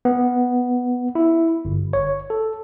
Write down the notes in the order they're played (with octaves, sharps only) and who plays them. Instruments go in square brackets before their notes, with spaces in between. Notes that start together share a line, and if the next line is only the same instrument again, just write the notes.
[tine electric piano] B3
E4
G1
C#5
A4